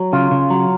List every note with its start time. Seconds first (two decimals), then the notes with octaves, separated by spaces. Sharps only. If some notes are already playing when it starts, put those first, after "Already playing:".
Already playing: F#3
0.13 C#3 F4
0.31 C#3
0.50 F#3